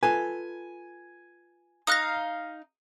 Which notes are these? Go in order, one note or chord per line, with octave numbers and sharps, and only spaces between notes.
F4 A4 B4 G#5
D#4 F5 D#6 F#6 A#6